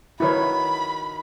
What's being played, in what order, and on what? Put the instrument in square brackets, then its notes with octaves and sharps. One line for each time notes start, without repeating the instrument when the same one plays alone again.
[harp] D#3 F#4 [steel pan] E4 B4 C#5 [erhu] B5